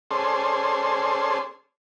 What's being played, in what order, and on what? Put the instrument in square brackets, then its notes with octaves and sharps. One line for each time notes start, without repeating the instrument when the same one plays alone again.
[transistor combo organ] C#4 G#4 A4 C5 D5 C6